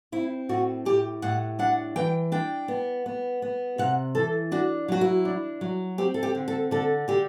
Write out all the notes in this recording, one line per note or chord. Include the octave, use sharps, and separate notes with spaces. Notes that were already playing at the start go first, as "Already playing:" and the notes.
C4 E4
A2 F#4
A2 G4
A2 F#5
D4 F#5
E3 G5
D4 G5
B3
B3
B3
C3 F#5
E3 A4
D4 F#4
F#3 F#4
E4
D4
F#3
C4 G4
A4
G4
D3
A4
D3 A4
D3 G4